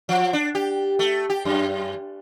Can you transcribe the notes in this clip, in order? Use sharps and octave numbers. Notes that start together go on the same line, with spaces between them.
F3
D4
G4
A3
G4
F#2